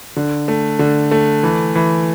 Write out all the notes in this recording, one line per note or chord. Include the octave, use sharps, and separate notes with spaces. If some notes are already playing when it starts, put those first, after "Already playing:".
D3
A3
D3
A3
E3
E3